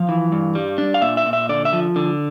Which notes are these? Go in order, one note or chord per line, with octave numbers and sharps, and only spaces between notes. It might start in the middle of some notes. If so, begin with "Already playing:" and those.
Already playing: F3 F5
E3
G2
G3
D4
F5
A#2 E5
E5
A#2
E5
D3 D5
E5
F3
D3